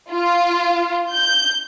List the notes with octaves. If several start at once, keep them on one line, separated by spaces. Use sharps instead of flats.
F4
G6